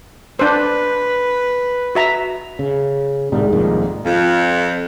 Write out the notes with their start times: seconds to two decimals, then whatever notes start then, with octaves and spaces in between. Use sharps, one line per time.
0.39 D4 B4 C5
1.95 F#4 E5 A#5
2.59 C#3
3.32 C2 G#2 G3
3.52 F2 A#2 D#3
4.05 F2